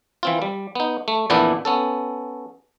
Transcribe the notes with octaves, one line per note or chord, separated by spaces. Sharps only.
E3 C4 F4
G3
B3 D#4
A3
F2 A#2 E3 B3 D4 E4
B3 C#4 A4